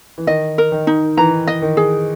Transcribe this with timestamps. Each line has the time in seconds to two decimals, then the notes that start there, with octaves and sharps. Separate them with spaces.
0.18 E3
0.27 D#3 D#5
0.58 A#4
0.72 D#3
0.87 D#4
1.17 E3 A#5
1.47 D#5
1.62 D#3
1.77 G#4